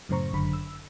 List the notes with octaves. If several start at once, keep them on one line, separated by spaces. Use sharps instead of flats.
F#2 A2 C#3 C5 A#5 C#6
G1 F#2 D3 B5
E6